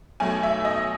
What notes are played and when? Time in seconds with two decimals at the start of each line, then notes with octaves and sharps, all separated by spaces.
0.20 B1 B2 F#3 A3 G#5
0.43 E5
0.65 D#5